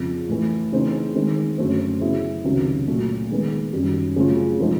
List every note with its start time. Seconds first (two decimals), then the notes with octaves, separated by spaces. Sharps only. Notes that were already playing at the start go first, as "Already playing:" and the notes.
Already playing: F2 C#3 F3
0.29 A2 E3 A3
0.72 C#3 E3 A3 C4 D#4
1.15 D#3 G#3 C4
1.58 F#2 D3 F#3 A3 C4
2.01 C#3 F#3 B3 E4 G#4
2.44 C#2 C3 D#3 F#3
2.87 A#2 F#3 A3
3.30 D#3 G#3 B3
3.73 F#2 D#3 G3
4.16 C#3 F#3 A3 C4 F4
4.59 C3 F3 G#3 C4 D#4